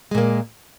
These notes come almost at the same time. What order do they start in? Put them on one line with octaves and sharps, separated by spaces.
G#3 A#2 A#3